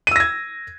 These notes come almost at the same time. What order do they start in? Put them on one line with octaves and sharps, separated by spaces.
D#7 E6 A#6 G#6